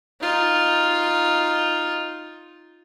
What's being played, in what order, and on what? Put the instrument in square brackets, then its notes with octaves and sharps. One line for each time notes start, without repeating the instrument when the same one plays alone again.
[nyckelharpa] D#4 F4